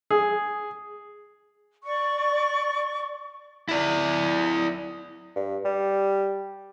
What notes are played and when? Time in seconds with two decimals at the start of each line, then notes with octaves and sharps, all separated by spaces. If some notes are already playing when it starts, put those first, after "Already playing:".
0.11 G#4
1.83 D5 C#6
3.68 E4 D5
5.36 G2
5.65 G3